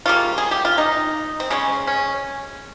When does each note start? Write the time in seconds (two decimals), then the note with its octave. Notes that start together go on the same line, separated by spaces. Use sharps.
0.06 C#3 G3 A#3 F4
0.38 G#4
0.51 G4
0.65 F4
0.78 D#4
1.40 C4
1.50 C#3 G#3 C#4
1.87 C#4